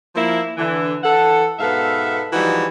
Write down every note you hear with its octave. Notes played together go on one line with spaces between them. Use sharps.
F3 A#3 E4
D3 E3
E3 A4 F#5
G#2 B2 B3 A4 E5 F5
E3 F3 G3 G#3 D#4 F#4